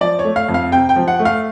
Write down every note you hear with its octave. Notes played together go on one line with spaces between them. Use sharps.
F3 D5
C#5
A3
F5
F2
F5
C3 G5
G5
F3
F#5
A3
F5